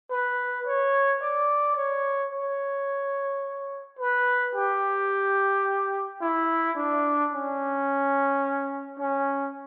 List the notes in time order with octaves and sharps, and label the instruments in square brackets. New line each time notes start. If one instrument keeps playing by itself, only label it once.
[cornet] B4
C#5
D5
C#5
C#5
B4
G4
E4
D4
C#4
C#4